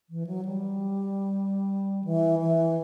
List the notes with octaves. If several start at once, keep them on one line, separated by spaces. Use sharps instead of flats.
E3
F#3
G3
E3
E3